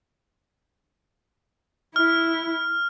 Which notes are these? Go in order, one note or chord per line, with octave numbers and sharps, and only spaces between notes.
E4 F6